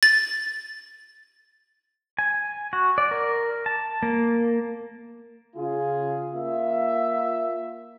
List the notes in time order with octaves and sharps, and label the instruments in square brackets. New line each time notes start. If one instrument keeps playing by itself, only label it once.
[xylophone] A6
[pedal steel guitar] G#5
F#4
D5
A#4
A5
A#3
[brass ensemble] C#3 F4 G#4
A#3 F4 E5